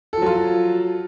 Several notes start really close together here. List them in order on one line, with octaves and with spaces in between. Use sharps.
A4 F3 F#3 F4